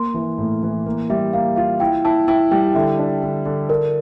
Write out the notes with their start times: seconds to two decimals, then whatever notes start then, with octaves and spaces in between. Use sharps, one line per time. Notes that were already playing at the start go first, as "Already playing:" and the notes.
Already playing: A#3 C6
0.14 E3
0.38 A2
0.63 E3
0.86 A#3
1.10 G3 E5
1.33 A#3 F5
1.56 F4 F5
1.80 E4 G5
2.05 E4 A5
2.28 E4 G5
2.51 G3 G5
2.74 D3 E5
2.99 D4
3.23 D3
3.45 D3
3.69 D4 A#4